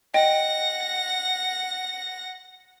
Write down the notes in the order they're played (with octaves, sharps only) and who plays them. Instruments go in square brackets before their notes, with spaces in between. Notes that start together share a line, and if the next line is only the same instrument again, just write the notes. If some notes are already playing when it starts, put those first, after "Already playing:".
[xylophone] D#5 G5 [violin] F#5 A#6